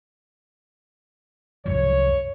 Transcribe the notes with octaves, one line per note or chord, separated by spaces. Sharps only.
C2 F#2 F3 C#5